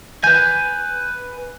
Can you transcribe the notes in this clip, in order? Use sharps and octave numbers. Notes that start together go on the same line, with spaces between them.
B4 G#5 G6